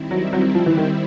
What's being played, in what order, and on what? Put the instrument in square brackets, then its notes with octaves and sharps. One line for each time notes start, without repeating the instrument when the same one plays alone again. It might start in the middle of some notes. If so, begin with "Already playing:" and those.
Already playing: [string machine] D#3 G3 C4 E4
[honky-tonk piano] F#3
F#3
F3
E3
D#3